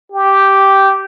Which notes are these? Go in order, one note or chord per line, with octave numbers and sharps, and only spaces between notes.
G4